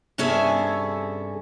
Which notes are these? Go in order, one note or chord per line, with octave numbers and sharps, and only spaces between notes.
G2 C3 C#4 G#4 A4 E5